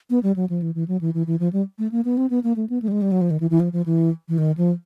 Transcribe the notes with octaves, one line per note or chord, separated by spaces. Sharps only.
B3
G3
F#3
F3
E3
E3
F#3
E3
E3
E3
F3
G3
A3
A#3
B3
C4
B3
A#3
A3
B3
A3
G3
G#3
G3
F#3
F3
D#3
E3
E3
F3
F3
E3
E3
D#3
F3